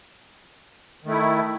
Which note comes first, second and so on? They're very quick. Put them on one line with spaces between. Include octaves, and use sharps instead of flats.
D#3 A3 E4